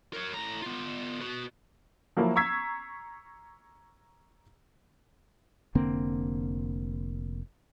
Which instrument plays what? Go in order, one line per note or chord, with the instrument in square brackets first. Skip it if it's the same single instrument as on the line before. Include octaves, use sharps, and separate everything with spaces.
[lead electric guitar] A#4 C#5
A2 A#5
B3 F4
F#4 B4
[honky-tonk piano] F3 F#3 A#3 E4
A#5 C#6 E6 G#6 B6 C7
[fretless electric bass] F1 D3 A#3 C4